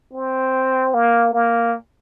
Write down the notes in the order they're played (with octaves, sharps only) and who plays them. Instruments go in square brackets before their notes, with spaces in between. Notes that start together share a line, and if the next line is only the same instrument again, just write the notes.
[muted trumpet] C4
A#3
A#3